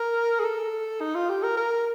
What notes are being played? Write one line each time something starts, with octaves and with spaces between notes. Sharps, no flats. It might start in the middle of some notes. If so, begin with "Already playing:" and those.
Already playing: A#4
G#4
A4
D#4
F4
G4
A#4
A#4